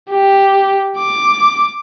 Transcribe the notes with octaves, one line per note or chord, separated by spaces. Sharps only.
G4
D6